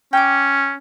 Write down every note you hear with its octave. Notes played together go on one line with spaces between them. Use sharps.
C#4 G5 D6